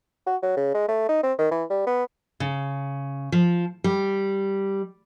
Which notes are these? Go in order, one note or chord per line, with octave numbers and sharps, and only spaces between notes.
F#4
F#3
C#3
G#3
A3
D#4
C4
D#3
E3
G3
B3
C#3
F3
G3